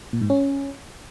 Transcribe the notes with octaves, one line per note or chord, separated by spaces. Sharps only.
A#2
G#2
C#4